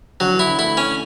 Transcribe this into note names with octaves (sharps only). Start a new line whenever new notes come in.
D3 F#3
E3
E4
D3
A3 E4
C#4